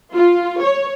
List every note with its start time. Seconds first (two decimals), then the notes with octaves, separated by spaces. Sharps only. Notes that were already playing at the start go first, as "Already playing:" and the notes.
0.14 F4
0.61 C#5